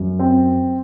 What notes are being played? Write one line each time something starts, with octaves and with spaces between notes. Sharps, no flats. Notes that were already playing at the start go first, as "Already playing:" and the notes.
Already playing: F#2
C4